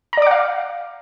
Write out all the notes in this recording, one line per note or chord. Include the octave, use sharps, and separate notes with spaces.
D5 F5 F#5 A#5 D6